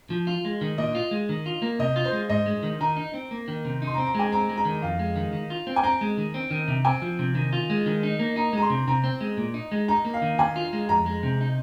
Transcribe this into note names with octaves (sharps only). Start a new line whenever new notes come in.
F3
F4
G#3
D#3
A#2 D#5
F4
G#3
D#3
F4
A#3
C3 D#5
F4
C5
G#3
G#2 D#5
G#3
D#3
D#3 A#5
D#4
C4
A#3
D#3
C3
D#4 C6
A#5
C4
A#5
G#3 G#5
C4 A#5
G#3
A#5
D#3
F2 F5
G#3
D#3
D#3
F4
C4
G#5
C4 A#5
G#3
D#3
C4
D#3
C3
C4 G#5
F3
C3
D#3
F4
G#3
D#3
D#4
A#3
D#4 A#5
G#3 A#5
C6
C3
C3 A#5
C4
G#3
A#2
D#4
G#3
D#4 A#5
A#3
F5
D#3
D#3 G#5
F4
G#3
F2 A#5
G#3
C3
D#4